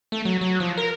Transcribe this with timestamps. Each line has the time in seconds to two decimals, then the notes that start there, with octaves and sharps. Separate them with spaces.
0.12 A3
0.25 F#3
0.41 F#3
0.60 F3
0.77 A#4